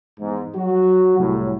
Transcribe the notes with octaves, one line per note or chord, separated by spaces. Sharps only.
E2 G#2 G#3
F#3 F#4
C2 A2 F#3